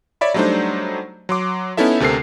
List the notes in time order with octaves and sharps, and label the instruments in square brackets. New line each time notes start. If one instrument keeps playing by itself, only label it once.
[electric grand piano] C#5 D5 E5 B5
F#3 G3 A3 D4 D#4 C5
F#3 C6 D6
B3 C#4 D#4 E4 A4 E5
D2 C3 A4 A#4 C7